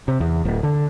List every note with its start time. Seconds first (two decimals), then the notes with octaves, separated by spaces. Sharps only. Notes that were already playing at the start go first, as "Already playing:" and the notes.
0.08 C3
0.20 E2
0.45 D1
0.63 D3